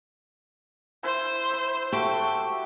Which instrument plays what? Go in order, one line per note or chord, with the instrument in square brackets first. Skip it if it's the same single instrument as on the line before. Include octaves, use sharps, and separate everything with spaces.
[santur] E4 [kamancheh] C5
[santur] E5 B5
[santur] A3 F#4 [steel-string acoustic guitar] G4